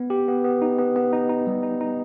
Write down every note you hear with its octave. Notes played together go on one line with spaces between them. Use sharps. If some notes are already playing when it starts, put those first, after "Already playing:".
Already playing: B3
G4
B3
B3
D#4
B3
B3
D#4
D#4
G3
D#4
D#4